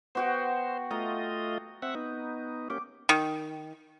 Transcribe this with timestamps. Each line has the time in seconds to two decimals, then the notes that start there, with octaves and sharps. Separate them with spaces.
0.15 B3 F#4 C5 G5
0.91 A3 F4 D#5 A#5
1.82 C4 E5 F#5
1.95 B3 D#4
2.70 A#3 C#4 G4 D6
3.09 D#3